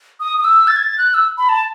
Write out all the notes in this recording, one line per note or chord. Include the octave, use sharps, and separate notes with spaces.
D#6
D#6
E6
A6
G#6
A6
F#6
E6
B5
A5